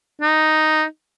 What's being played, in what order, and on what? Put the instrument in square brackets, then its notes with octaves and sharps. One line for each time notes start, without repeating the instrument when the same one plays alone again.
[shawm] D#4